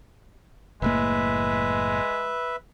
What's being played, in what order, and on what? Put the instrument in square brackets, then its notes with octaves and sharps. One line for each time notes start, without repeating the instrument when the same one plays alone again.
[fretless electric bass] F#1 A2 A#3 [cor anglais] G#3 [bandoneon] B4 E5